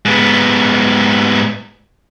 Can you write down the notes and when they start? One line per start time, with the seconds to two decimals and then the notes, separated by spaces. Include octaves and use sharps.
0.05 G#2 B3